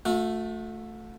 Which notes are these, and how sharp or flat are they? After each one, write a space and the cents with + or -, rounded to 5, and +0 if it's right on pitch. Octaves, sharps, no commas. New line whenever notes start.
A3 +0 F#4 -45